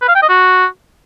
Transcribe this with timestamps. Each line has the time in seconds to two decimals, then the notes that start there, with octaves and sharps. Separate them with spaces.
0.01 B4
0.08 F5
0.15 G5
0.22 D#5
0.29 F#4